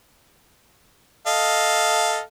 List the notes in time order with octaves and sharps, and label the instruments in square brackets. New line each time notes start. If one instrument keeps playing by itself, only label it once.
[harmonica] A4 D#5 F5